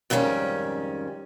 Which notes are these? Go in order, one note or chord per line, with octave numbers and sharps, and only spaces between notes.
F2 G#2 D#3 G3 C#4